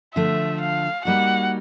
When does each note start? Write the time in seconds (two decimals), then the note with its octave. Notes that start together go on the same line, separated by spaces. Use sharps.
0.15 D3 F3 A3 E5
0.60 F5
1.05 G3 A#3 D#4 F#4 F#5